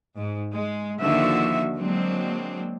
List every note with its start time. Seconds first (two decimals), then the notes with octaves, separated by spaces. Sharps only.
0.16 G#2
0.53 G#3
1.00 D#2 D3 D#3 F3 F#4 E5
1.78 F#3 G#3 A#3 C4 D4